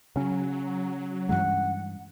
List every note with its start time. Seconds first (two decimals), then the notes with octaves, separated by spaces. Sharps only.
0.16 C#3 F#3 C#4
1.29 G2 E3 G#3 F#5